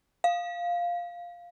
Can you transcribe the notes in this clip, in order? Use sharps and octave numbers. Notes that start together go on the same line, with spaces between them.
F5